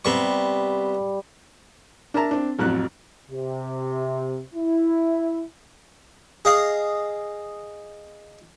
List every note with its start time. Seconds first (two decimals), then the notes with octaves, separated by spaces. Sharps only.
0.05 C3 G3 B3 C#6
2.14 D4 A#4 E5 A5 A#5
2.31 C4 D4
2.59 A1 F2 F#3 F#6
3.30 C3
4.55 E4
6.45 G#4 D#5 F5